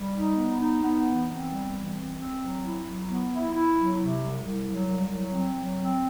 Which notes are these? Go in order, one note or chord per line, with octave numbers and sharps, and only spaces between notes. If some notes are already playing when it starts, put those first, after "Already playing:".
Already playing: G3
D#4
B3
D#4
B3
E3
C4
G3
E3
C4
C4
F#3
E4
F#3
B3
E4
E4
F#3
C3
C2
C2
F#3
C2
F#3
C4
F#3
C4